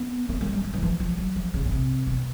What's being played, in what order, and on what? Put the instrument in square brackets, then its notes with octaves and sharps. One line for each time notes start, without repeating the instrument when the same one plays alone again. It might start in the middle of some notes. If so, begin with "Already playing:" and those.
Already playing: [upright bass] B3
A#3
G#3
G3
F#3
E3
F3
F3
F#3
F3
C#3
B2
C3
B2